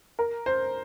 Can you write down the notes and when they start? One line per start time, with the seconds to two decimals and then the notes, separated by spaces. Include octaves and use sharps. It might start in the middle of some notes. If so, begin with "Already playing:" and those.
0.19 A#4
0.46 C5